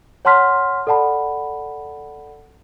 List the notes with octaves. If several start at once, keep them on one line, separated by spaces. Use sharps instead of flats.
C#5 F#5 A5 C6 F6 B6
A4 D5 F#5 A5 B5